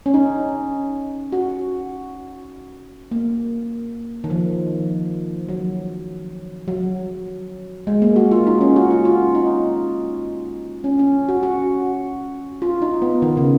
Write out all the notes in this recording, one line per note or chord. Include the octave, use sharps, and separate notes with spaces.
C#4
D#4
F#4
A#3
D#3
F3
F#3
F#3
G#3
A#3
F#4
F4
D#4
C#4
F#4
F4
F4
D#4
C#4
C#4
F#4
F#4
F4
D#4
B3
D#3
C#3